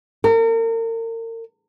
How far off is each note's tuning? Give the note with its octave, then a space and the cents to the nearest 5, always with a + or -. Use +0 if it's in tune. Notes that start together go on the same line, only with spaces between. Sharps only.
A#4 -40